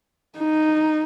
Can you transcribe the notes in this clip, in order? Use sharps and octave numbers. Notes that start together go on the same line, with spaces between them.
D#4